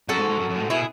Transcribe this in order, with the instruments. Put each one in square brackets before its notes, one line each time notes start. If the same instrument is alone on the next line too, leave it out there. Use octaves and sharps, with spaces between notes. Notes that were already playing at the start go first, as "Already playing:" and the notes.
[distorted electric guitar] F#2 [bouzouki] F#4 A4
[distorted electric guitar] G#2
G#2
F#2
F#2
A2
G#2
[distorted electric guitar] B2 [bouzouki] E4 G#4